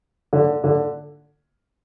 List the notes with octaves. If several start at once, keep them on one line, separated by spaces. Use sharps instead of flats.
D3
D3